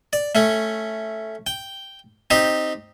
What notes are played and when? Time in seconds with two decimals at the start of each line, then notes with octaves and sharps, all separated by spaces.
0.13 D5
0.35 A3 C#4
1.47 G5
2.30 C4 D#4 G4